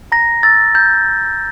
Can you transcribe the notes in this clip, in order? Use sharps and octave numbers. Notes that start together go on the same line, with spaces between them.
A#5 A#6
E6 A6
A#5 G6